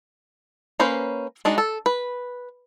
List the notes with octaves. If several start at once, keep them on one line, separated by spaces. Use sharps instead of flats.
A#3 C#4 B4 C5
G#3 D4 D#4 F#4
A4
B4